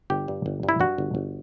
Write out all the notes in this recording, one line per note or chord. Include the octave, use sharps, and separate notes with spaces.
G1 G4
G2
G1
G2
E4
G2 F#4
G1
G1